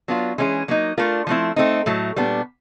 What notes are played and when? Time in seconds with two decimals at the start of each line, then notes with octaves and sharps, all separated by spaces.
0.08 F#3 B3 D4 F4
0.38 E3 G#3 C#4 E4 G#4
0.68 F#3 A#3 D#4
0.98 A3 D4 F4 A#4
1.27 F3 A3 C4 E4
1.56 A3 C4 D#4
1.86 A2 F#3 A3
2.16 A#2 G3 B3 D4